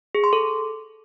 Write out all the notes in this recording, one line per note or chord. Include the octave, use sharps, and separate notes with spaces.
G#4
C6
A4